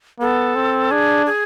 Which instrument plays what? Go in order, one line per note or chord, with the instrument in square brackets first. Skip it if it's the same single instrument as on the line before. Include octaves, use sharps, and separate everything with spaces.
[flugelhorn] B3 [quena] A4
[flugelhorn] C4
[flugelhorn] D4 [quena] G#4
[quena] G#4